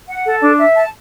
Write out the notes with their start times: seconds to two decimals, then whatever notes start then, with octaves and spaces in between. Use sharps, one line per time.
0.08 F#5
0.26 A4
0.41 D4
0.59 E5
0.75 A5